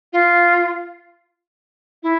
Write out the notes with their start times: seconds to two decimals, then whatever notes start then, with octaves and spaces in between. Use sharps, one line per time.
0.13 F4
2.03 E4